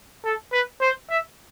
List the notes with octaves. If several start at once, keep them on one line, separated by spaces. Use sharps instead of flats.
A4
B4
C5
E5